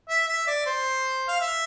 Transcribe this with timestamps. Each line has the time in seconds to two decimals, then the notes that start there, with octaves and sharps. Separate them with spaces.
0.09 E5
0.29 E5
0.47 D5
0.66 C5
1.28 F5
1.41 E5